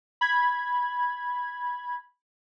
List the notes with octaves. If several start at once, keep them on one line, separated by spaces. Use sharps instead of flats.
B5 G#6